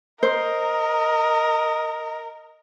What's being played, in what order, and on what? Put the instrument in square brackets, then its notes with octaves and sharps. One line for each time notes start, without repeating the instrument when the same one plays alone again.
[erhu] A#4 [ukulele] C5 [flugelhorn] D#5